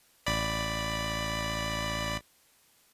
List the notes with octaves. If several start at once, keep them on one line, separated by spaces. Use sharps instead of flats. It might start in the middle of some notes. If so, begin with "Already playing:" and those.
A1 D5 B5